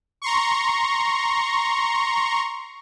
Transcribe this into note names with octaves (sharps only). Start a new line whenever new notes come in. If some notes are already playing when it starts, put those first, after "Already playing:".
A#5 C6 C#6